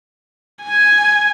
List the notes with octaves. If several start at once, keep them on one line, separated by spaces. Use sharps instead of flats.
G#5